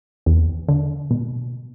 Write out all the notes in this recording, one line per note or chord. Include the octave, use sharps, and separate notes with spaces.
E2
D3
B2